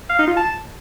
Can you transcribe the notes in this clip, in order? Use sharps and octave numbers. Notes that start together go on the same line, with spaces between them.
F5
D#4
F4
A5